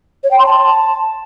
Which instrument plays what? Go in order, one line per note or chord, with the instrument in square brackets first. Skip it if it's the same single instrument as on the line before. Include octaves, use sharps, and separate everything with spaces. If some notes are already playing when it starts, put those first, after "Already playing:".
[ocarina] C#5
G5
C6
A5